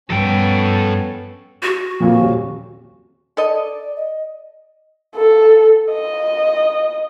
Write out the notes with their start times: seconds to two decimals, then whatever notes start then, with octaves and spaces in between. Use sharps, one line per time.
0.10 G2 F3 B3 C#4 A4 G5
1.63 F#4
2.00 F2 A#2
2.20 D#1
3.37 A4 D5 D#5
3.96 D#5
5.16 A4
5.92 D#5